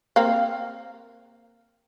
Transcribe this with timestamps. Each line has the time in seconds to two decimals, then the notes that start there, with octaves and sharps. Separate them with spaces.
0.16 A#3 C4 F5